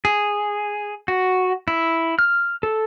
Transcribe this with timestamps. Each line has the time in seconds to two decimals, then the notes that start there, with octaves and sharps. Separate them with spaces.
0.05 G#4
1.08 F#4
1.68 E4
2.19 F6
2.63 A4